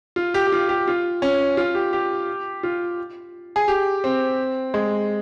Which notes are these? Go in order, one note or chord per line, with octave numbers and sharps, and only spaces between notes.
F4
G4
G4
F4
G4
F4
C#4
F4
G4
G4
F4
G#4
G4
C4
G#3